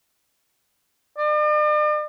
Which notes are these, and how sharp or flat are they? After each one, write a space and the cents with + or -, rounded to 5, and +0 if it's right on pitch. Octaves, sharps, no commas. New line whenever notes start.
D5 +45